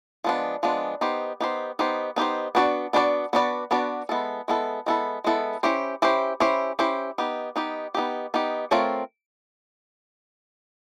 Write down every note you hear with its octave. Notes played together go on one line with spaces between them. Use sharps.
F3 G#3 B3 D4
F3 G#3 B3 D4
B3 D#4 G4 C5
B3 D#4 G4 C5
B3 D#4 G4 C5
B3 D#4 G4 C5
B3 D4 F#4 B4 D5
B3 D4 F#4 B4 D5
B3 D4 F#4 B4 D5
B3 D4 F#4 B4 D5
G#3 B3 E4 A4
G#3 B3 E4 A4
G#3 B3 E4 A4
G#3 B3 E4 A4
C#4 E4 G4 C5
C#4 E4 G4 C5
C#4 E4 G4 C5
C#4 E4 G4 C5
B3 D#4 G4
B3 D#4 G4
B3 D#4 G4
B3 D#4 G4
A3 C4 F4 A#4 C#5